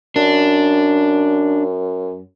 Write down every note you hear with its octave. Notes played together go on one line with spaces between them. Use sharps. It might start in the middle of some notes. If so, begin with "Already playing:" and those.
F#2 D4